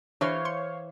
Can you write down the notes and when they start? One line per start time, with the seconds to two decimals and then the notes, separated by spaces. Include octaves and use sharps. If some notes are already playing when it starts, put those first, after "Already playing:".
0.21 E3 D4 G4 C5 C#5 F5 C#6 A6
0.45 C6 C#7